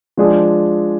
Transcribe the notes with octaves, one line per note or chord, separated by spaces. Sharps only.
F3 G#3 D4 G#4